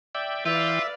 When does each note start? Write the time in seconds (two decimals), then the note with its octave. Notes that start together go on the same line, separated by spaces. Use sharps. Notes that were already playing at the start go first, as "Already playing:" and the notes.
0.15 D5 E5 G5
0.46 E3 F4 B4 D5 E5 F5 G5